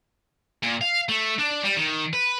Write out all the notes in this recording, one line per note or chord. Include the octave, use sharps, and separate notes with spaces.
A#2
F5
A3
D4
G3
D#3
B4